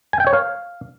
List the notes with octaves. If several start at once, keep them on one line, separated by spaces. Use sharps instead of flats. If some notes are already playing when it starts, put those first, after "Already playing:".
G#5
G5
C#5
F5